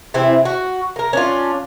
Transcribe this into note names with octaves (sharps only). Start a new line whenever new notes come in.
C3 E3 C4 E4
F#4
A#3 A#4
C#4 D4 F4